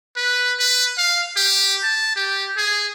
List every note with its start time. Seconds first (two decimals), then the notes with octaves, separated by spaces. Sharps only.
0.16 B4
0.59 B4
0.98 F5
1.37 G4
1.83 A5
2.16 G4
2.57 G#4